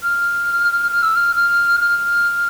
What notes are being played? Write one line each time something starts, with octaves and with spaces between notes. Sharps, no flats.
F6
F6
E6
F6
F6
F6